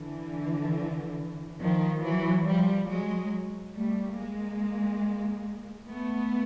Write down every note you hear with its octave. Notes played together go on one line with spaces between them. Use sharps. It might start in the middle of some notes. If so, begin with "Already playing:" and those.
Already playing: D3 E3
D#3 F3
E3 F#3
F3 G3
F#3 G#3
G3 A3
G#3 A#3
A3 B3